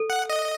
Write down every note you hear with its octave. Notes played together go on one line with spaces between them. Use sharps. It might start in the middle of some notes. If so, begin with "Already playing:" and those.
Already playing: A4
F#5
D#5